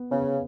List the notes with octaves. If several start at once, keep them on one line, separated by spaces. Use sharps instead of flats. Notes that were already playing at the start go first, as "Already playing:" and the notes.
Already playing: B3
C#3 B3